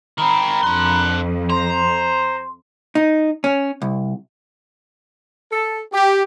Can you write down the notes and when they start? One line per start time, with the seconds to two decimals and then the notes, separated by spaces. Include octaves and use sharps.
0.18 D#3 C4 A#5 B5
0.63 F2 D4 C6 F#6
1.50 C5 A#5 C6
2.95 D#4
3.44 C#4
3.82 C2
5.51 A4
5.92 G4